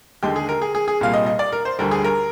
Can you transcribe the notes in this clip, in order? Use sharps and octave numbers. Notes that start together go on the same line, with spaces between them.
D#2 D3 G#3 G4
G#4
A#4
G#4
G#4
G#4
C2 A#2 G3 A#3 F5
D#5
D#5
D5
A#4
C5
D2 D3 G3 A#4
G#4
A#4